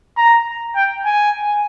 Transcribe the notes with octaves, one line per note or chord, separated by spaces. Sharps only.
A#5
G5
G#5